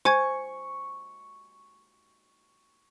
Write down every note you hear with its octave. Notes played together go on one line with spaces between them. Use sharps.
C5 G#5 C#6 G#6